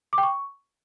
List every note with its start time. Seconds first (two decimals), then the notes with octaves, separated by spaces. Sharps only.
0.13 D6
0.18 G5
0.23 C#6